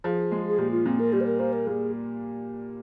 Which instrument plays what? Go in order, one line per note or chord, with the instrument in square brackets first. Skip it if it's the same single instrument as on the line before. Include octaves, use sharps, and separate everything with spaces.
[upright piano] F3 [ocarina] G#4
[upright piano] G#3
[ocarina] G#4
[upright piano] A#2 [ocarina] G4
[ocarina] F4
[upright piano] A#2 [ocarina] C4
[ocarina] A#4
[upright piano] G3 [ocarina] G4
[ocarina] C5
A#4
[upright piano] A#3 [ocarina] C5
[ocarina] A#4
[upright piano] A#2 [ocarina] G#4